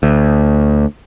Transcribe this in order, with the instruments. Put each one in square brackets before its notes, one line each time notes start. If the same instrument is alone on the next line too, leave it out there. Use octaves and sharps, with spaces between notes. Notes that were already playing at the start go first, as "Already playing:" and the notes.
[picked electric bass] D2